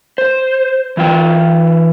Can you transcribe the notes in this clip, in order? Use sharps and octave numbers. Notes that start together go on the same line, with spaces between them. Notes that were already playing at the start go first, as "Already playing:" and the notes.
C5
E3 F4 G5